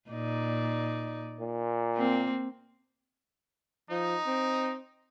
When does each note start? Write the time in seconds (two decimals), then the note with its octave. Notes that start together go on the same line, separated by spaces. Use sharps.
0.10 A#2 D#4 D5
1.40 A#2
1.95 A#3 C4
3.90 F3 D#4
4.26 C4